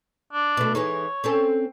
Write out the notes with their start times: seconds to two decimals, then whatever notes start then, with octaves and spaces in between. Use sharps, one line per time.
0.33 D4
0.57 B2 A3
0.75 E3 G#3 D#4 C#5
1.24 C4 C#4 A4